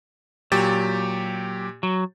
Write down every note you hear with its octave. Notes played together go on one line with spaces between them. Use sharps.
A#2 F#3 G4 A6
F#3